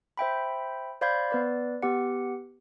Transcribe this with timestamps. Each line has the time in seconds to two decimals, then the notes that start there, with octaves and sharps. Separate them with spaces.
0.17 C5 E5 G5 B5
1.01 C5 D5 F5 B5 G6 G#6
1.30 B3 B4 D5
1.82 B3 G4 F#5